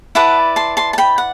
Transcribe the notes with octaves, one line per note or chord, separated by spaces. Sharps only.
E4 B4 D5 F#5 A5
A5 C6
A5 C6
A5
G5 B5
F#5